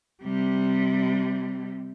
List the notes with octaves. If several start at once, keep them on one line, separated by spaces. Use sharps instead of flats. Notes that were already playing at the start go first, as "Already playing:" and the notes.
C3 G3